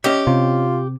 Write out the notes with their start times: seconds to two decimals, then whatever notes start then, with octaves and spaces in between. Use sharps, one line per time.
0.04 C#4 G4 D#5 E5
0.27 C3 F4